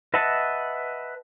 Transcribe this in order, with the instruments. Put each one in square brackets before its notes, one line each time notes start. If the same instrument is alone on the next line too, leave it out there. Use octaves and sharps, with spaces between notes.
[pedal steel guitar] B4 D#5 E5 F#5 A5